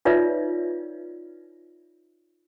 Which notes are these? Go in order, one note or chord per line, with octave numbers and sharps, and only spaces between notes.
D#4 F4 B4 C#5 D5 E5